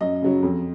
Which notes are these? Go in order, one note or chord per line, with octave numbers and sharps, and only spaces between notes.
F#2 D#5
C#3 F#3
F2